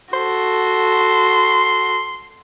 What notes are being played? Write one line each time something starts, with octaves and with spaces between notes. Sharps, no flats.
F#4 A4 C6